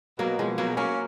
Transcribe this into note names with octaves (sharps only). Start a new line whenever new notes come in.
B2 F#3 A#3
B2 F3 G#3
B2 F#3 A#3
F#3 A#3 C#4